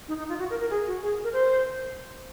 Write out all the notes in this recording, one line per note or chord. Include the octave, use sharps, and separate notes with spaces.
D#4
D#4
F4
F#4
A#4
A#4
G#4
F#4
G#4
A#4
C5